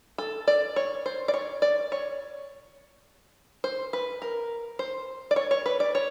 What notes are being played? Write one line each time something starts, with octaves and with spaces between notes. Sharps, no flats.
A4
D5
C#5
C5
D5
C#5
D5
C#5
C5
B4
A#4
C5
D5
C#5
C#5
B4
D5
C#5